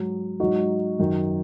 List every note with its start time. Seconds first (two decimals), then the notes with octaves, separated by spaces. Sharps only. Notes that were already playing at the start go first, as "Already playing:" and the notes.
Already playing: G#2 F#3
0.40 G#2 F#3 D#4 F#4
0.99 F#2 D#3 F#3